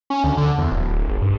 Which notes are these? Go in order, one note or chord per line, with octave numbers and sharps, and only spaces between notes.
C#4
D2
D3
E2
D1
D1
G#1
G2